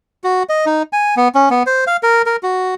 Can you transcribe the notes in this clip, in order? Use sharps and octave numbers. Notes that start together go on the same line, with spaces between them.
F#4
D#5
D#4
G#5
B3
C#4
B3
C5
F5
A#4
A#4
F#4